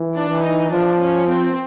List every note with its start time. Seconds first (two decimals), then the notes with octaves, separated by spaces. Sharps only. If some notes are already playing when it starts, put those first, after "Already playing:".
Already playing: E3
0.15 D4
0.29 E3
0.43 D#4
0.71 F3 D4
1.01 C#4
1.29 C4